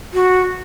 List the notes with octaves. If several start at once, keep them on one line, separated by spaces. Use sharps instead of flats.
F#4